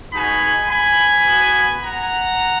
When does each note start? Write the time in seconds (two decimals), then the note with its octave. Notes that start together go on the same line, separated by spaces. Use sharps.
0.13 G#3 B3 D#4 F#4 G#5 B5
0.70 G#5 B5
1.28 B3 F#4
1.84 F#5 A#5